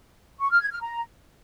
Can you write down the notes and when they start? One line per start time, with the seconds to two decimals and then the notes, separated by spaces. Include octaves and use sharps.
0.40 C#6
0.51 F6
0.61 G#6
0.71 F6
0.81 A#5